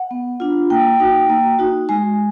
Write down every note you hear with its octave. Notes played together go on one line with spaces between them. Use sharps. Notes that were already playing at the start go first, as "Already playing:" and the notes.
Already playing: F#5
B3
D4 F4
A#3 G5
D#4 F#4
A#3
D#4 F#4
G#3 G#5